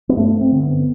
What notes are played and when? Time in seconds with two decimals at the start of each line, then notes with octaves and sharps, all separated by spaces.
0.09 B3
0.16 G2 A3
0.41 C4
0.52 D3
0.63 B3